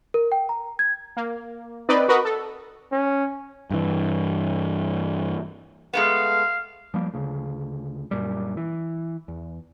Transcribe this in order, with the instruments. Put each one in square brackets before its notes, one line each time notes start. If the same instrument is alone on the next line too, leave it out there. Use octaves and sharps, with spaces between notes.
[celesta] A#4
G5
A#5
G#6
[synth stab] A#3
C4 D#4 B4 D5 D#5
F#4 A#4 B4 D#5
A4
[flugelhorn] C#4
[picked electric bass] G2 E3
[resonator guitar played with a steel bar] G#3 A3 B3 [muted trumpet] F5
[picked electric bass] F3 G3 A#3
D2 C#3
F#2 A#2 G3
E3
E2